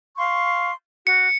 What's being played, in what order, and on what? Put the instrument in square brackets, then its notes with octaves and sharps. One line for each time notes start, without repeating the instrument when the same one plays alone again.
[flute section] F5 C6 C#6
[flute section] F#4 [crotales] C#7